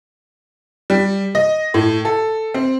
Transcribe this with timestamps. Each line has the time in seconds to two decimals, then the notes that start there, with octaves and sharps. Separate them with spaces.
0.90 G3
1.35 D#5
1.74 A2
2.05 A4
2.54 C4